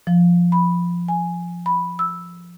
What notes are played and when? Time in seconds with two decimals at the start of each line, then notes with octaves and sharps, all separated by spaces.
0.07 F3
0.52 B5
1.08 G#5
1.66 B5
1.99 E6